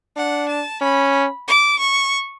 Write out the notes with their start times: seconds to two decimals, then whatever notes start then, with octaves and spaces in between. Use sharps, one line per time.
0.16 D4 F#5
0.49 A5
0.81 C#4 B5
1.48 D6
1.79 C#6